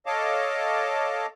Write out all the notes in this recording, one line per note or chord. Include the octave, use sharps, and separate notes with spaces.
A4 C#5 D#5 F5 A5 D6